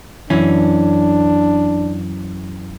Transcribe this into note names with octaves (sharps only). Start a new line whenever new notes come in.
F#2 E3 C#4 D4